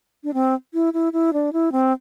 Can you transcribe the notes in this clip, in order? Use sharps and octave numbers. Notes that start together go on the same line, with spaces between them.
D4
C4
E4
E4
E4
D4
E4
C4